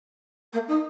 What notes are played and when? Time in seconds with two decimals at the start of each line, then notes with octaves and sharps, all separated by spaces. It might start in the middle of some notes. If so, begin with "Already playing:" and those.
0.52 A#3
0.67 D#4